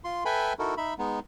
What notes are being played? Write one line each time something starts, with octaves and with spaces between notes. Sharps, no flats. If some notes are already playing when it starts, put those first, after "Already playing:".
F4 C6
A4 B4 E5 G5 G#5 B5
D#4 E4 F#4 A4 A#4
D#4 E5 B5
G#3 B3 D#4